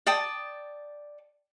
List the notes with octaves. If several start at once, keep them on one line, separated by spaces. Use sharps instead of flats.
D5 G5 A5 D#6